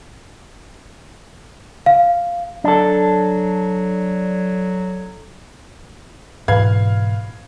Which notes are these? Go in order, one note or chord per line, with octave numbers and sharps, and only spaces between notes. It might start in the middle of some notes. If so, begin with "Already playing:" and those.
F5
F#3 D4 A4
G#2 B2 E3 B4 F5 G#6